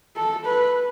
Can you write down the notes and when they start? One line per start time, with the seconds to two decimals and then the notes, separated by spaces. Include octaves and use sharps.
0.16 A4
0.45 B4